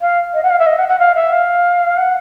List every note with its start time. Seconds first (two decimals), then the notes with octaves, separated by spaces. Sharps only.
0.01 F5
0.34 D#5
0.43 F#5
0.51 F5
0.59 E5
0.66 D#5
0.78 F#5
0.89 F#5
0.99 F5
1.15 E5
1.32 F5
1.97 F#5